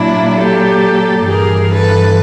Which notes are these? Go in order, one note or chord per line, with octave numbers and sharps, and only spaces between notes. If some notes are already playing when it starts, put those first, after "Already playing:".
Already playing: A#2 F#3 D4 E4
G4 A4
G2 E3 G#4 A#4
A4 B4